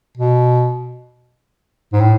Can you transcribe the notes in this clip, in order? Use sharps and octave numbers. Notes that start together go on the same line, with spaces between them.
B2
G#2
A2